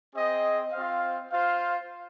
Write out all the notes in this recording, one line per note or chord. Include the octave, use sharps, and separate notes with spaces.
C4 G#4 D#5
C4 F4 C5 F5
F4 C5 F5